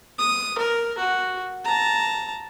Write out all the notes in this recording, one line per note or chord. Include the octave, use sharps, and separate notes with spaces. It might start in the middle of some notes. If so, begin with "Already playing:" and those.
D#6
A#4
F#4
A5 A#5